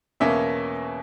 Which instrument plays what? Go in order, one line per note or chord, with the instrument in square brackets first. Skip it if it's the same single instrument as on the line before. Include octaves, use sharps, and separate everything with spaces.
[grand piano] E2 B2 A#3 C#4 E5